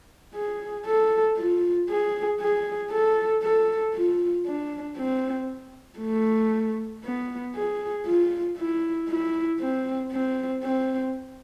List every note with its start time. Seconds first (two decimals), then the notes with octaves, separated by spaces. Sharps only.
0.35 G#4
0.86 A4
1.37 F4
1.89 G#4
2.41 G#4
2.91 A4
3.43 A4
3.95 F4
4.47 D4
4.98 C4
6.00 A3
7.04 B3
7.55 G#4
8.06 F4
8.58 E4
9.09 E4
9.60 C4
10.12 C4
10.63 C4